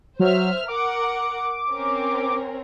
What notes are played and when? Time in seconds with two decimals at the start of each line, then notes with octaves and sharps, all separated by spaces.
0.20 F#3 C5 E5 F6
0.68 A#4 F#5 D6
1.71 C4 C#4 A#4